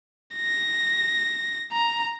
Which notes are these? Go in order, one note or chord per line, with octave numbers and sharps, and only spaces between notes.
A#6
A#5